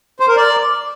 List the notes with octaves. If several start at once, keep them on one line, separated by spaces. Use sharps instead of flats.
C5
A#4
D5